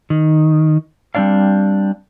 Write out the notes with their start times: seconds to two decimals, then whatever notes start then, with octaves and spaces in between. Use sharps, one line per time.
0.10 D#3
1.15 G3 C4 D4 D5 F5